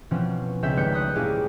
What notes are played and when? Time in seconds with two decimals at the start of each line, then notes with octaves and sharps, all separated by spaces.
0.11 B2 E3 F3 C4 C#4
0.62 C#2 C4 C#4 E5 G6
0.77 G#1 G3 A3 B4 G6 C#7
0.93 B5 D#6 F#6 G6
1.15 A#2 A#3 C#4 E4 G4 G#4